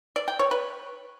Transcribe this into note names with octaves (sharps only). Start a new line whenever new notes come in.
D5
G5
C#5
B4